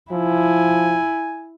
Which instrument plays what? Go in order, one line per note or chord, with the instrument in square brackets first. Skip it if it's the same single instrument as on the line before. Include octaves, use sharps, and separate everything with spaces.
[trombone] F3 [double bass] E4 [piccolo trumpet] G#5